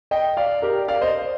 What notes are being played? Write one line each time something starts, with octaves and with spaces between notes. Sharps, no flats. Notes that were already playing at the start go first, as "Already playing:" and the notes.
D#5 G5
D5 F5
G4 A#4
D5 F5
C5 D#5